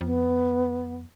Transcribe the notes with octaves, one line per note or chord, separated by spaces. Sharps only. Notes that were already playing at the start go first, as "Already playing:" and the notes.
F2 B3